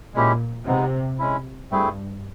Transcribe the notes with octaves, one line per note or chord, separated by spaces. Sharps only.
A#2 G#3 C#4 E4 G4
C3 G#3 B3 D#4
G#3 C#4 E4
G2 A3 C4 E4 G#4